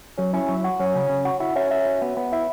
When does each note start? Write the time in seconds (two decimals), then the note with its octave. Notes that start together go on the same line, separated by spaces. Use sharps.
0.18 F#3 C#4
0.33 C#4 E4
0.48 F#3
0.64 F#4
0.80 F#3 C#4
0.95 C#3
1.09 C#3
1.25 F#4
1.40 E4 F#4
1.56 C#4 E5
1.71 E5
1.86 F#4
2.02 B3
2.17 B3
2.32 E4 E5